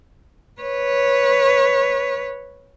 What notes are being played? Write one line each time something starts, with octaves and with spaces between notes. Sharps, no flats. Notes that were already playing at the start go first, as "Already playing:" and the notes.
B4 C#5